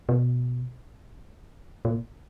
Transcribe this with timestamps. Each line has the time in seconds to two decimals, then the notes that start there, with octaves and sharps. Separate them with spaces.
0.09 B2
1.85 A#2